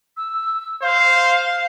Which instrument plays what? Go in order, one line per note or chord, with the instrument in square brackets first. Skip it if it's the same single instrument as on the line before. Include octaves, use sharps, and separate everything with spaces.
[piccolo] E6
[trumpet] C5 [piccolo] F5